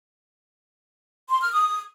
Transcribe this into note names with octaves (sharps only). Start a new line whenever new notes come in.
C6
F6
D#6